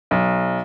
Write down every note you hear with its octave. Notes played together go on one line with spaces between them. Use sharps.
B1